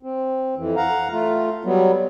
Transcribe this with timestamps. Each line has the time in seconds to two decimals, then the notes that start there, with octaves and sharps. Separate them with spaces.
0.03 C4
0.57 F2 E3
0.76 F5 F#5 A#5
1.12 A3 F4
1.65 F#3 G3 B3